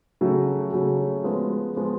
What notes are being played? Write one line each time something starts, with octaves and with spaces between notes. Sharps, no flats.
C#3 F#3 A3
C#3 F#3 A3
F3 G#3 B3
F3 G#3 B3